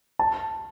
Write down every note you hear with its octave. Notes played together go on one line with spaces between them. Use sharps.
A5